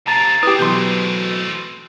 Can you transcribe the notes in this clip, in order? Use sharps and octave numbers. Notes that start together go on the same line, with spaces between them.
C3 A#3 A5 A#5 A6
A3 C4 E4 G4 B4 D#6
B2 E3 F#3 C6 G6